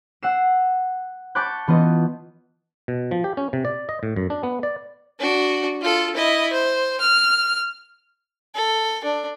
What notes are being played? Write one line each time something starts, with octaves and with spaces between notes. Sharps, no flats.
F#5 E6 C7 E7
A5 B5 C#6 D6 F#6 G6
E3 B3 F4 D#5
B2
F3
G4
C#4
C3
D5
D#5
A2
F#2
D4
B3
D5
D4 F#4
F4 A4
E4 D#5
C5
F6
A4
D4